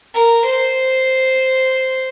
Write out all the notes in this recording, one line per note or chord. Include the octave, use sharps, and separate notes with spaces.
A#4
C5